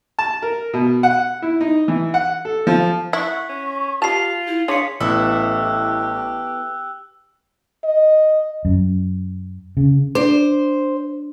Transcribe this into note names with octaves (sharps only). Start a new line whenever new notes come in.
A5
A#4
B2
F#5
E4
D#4
E3
F#5
A4
F3
E4 F#5 C#6 B6
C#4
F4 G4 A5 B5 C7 F7
E4
D4 G#4 C#5 F5 C6 B6 C#7
A1 B3 E4 G4 A4 E6 F#6
D#5
F#2
C#3
D4 C5 D5